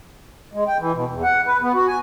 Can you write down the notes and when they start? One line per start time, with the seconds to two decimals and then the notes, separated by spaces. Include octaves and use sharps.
0.53 G#3
0.67 G5
0.79 E3
0.94 B2
1.10 E2
1.23 F#5
1.46 B4
1.61 B3
1.74 F#4
1.87 G#5